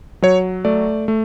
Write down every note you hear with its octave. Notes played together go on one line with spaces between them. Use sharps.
F#3 C#5
A3 D5
A3